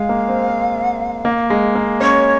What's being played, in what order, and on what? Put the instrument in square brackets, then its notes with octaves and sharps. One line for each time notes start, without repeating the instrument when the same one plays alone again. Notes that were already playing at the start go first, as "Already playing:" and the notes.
Already playing: [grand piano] G#3 [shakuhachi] F5
[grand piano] A#3
C4
C4
A#3
G#3
A#3
[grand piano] C#4 [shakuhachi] C#5